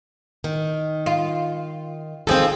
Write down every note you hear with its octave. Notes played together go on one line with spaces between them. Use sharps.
D#3
F4
D#2 F3 C4 G#4 A4